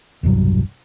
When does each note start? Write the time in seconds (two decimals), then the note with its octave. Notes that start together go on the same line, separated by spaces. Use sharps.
0.23 E1 C2 G2 F#3